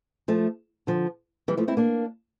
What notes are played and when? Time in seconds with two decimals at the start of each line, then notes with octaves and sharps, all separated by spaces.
0.28 F3 A3
0.87 D3 F3
1.48 E3 G3
1.57 F3 A3
1.68 C4 E4
1.77 A#3 D4